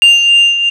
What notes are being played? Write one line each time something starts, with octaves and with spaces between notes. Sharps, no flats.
F7